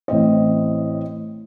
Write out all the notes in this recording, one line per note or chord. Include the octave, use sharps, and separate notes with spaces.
A1 A2 C4 D#5